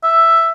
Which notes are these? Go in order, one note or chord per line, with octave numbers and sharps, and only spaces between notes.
E5